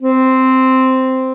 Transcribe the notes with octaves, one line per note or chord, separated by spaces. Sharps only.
C4